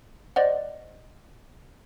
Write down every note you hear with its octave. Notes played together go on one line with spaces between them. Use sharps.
C5 D5 D#5 F#5